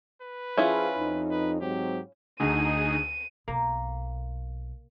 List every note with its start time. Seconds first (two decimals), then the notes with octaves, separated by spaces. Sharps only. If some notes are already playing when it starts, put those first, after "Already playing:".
0.22 B4
0.57 F3 C#4 E4 F4 G#4
0.97 F2 D#4
1.31 B4
1.61 G#2 F#3 C4 G4
2.40 D2 D#4 G#4 D#7
3.48 B1 A#3